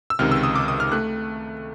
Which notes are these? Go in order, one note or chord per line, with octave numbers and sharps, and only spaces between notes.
E6
C#2 C3 D#3 F6
E6
D#6
D6
D#6
F6
A3 F#6